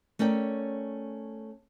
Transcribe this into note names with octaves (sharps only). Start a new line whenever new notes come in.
A3 C#4 A#4 D5 G5